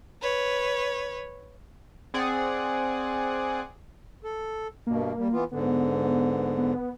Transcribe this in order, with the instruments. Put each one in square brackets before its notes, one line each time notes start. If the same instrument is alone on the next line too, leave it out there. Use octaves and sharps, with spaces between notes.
[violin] B4 C#5
[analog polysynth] C4 G#4 D5 F#5
[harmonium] A4
[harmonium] G2 B2 [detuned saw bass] A#3
[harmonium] G3
E3 B3 F4
[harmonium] G#2 D3 [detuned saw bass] B3
[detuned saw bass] B3